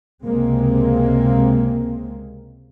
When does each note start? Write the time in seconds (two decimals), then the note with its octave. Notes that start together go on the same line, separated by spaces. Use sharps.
0.24 C#2 C3 G#3 A#3 C4